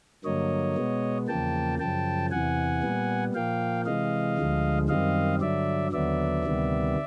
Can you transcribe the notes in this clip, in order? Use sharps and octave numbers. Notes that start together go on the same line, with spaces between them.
G2 D3 F#3 A#3 C#5 D#5
B2 G#3 B3
E2 C#3 F3 A#3 G5 A5
F#2 C#3 F3 G5 A5
E2 C3 E3 F#5 G#5
A#2 G3 B3
A#2 F3 A#3 F5 G5
C3 E3 G#3 D#5 F5
D2 D3 F3 G#3
F#2 D#3 G3 C4 D#5 F5
G2 D3 F#3 D5 E5
D#2 D3 F#3 B3 D5 E5
D2 C3 D#3 G3 B3